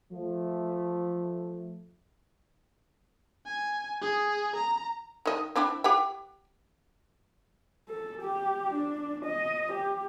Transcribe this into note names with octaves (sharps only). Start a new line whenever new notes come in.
F3 A3
G#5
G#4
A#5
D#3 D#5
C4 D4 E4
G4 F#5 G5
A4
G4
D4
D#5
G4